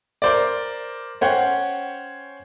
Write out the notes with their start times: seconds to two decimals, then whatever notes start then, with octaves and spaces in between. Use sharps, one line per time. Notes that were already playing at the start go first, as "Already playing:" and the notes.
0.22 A#4 C5 D5
1.21 C#4 C5 C#5 F#5 G5